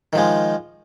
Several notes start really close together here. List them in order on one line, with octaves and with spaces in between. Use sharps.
D#3 F3 G#3